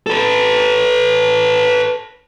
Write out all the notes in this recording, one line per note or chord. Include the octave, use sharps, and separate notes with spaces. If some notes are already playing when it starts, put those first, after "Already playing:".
A4 B4